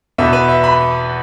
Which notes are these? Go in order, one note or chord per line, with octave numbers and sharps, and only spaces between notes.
E2 B2 B3 E5
B4
E5
B5